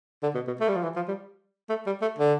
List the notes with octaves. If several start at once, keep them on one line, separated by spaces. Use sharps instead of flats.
D3
B2
B2
A3
G3
F3
E3
F3
G3
A3
G3
A3
D3